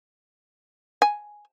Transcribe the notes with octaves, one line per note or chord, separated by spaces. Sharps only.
G#5